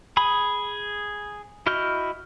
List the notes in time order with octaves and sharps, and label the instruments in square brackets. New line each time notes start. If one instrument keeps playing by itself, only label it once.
[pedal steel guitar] G#4 B5 D#6
E4 F#4 D#5 F6 G6